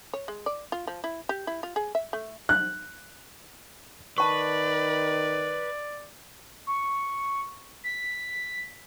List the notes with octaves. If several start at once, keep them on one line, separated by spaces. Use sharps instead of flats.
C#5
G#3
D5
F4
F3
E4
G4
E4
F4
G#4
E5
A3
F#6
D#3 B4 D5 A5 C#6
C#6
B6